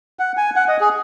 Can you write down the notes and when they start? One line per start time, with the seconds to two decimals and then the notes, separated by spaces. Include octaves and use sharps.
0.19 F#5
0.37 G#5
0.56 F#5
0.68 D#5
0.80 G#4